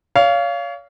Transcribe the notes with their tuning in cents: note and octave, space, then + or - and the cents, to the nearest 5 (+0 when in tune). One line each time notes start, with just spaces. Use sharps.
C#5 +35 F5 -10